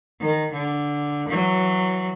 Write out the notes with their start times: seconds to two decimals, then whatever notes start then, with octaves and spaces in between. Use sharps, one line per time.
0.20 D#3
0.51 D3
1.28 E3 F#3